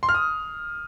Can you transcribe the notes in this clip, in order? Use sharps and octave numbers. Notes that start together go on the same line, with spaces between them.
C6
F6
D#6